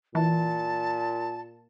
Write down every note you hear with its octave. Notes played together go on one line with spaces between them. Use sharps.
A#2 E3 A5